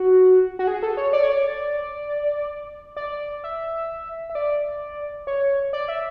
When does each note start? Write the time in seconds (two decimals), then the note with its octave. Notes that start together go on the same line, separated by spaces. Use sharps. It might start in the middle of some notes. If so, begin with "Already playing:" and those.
Already playing: F#4
0.59 F#4
0.67 G#4
0.82 A4
0.97 C#5
1.13 D5
1.23 C#5
1.32 D5
2.97 D5
3.44 E5
4.30 E5
4.35 D5
5.27 C#5
5.73 D5
5.88 E5